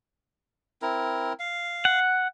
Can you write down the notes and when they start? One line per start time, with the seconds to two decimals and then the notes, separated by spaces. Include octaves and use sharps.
0.82 C4 E4 A#4
1.40 F5
1.85 F#5